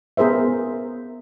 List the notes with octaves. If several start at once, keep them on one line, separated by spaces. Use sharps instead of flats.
B3 G#4 A#4 C5 E5